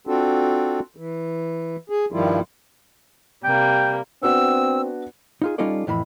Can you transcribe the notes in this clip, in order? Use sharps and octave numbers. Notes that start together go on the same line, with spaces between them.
C4 D4 F4 F#4 A4
E3
G#4
G2 D#3 F3 G3 E4 F4
C3 G3 A#3 G5
B3 C4 D4 F#4 E6
D#4 F4 G#4
G3 C#4 D#4 F4 A4 D5
F2 A2 E3 B5